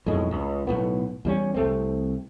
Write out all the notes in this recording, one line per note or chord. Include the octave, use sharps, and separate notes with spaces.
B1 F2 A2 G#3
C#2
B1 E2 A2 B3
E2 G3 C#4
C2 A3 C4